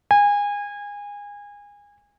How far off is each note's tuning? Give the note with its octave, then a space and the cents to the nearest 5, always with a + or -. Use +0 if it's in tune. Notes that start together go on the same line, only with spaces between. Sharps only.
G#5 -25